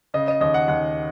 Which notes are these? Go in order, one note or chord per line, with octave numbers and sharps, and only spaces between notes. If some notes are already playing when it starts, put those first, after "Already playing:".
C#3 D#5
D#5
D#2 D#5
F#5
D#2 F#5